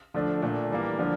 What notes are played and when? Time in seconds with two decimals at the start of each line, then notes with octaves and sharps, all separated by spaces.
0.14 D3 F3 A3 D4
0.42 A#2 A3 D4
0.70 E3 G3 A#3
0.99 D3 F3 A#3 D4